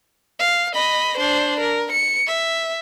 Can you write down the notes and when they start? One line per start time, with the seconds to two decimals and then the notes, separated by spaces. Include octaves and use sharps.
0.39 F5
0.74 D#5 B5
1.17 D4 C5
1.60 A#4
1.92 C#7
2.27 E5